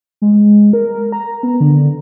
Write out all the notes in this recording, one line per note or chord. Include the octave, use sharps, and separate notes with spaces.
G#3
A#4
A#5
B3
D3